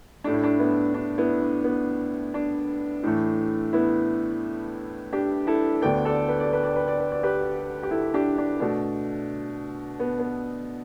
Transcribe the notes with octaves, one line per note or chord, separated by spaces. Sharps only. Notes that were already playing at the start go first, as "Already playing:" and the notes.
A2 A3 D4
E4
D4
B3 E4
D4
B3 E4
D4
B3
D4
A2 E3 A3
B3 E4
D4 G4
E4 A4
D2 D3 B3 D5 G5
A4 D5
B4
D5
B4
D5
B4
D5
B4
D5
G4 B4
G4
E4 A4
D4 G4
D4
B2 A3 D4
B3
B3